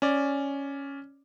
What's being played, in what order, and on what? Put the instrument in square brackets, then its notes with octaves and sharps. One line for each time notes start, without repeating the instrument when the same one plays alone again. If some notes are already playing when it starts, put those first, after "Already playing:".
[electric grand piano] C#4 D5